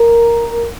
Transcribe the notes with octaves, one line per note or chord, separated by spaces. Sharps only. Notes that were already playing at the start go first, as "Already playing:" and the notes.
Already playing: A#4